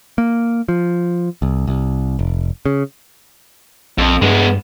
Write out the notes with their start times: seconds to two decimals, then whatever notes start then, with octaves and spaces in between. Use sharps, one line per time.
0.18 A#3
0.69 F3
1.42 C2
1.67 C2
2.19 F1
2.66 C#3
3.98 A#1 F2
4.22 G2 G#3 B3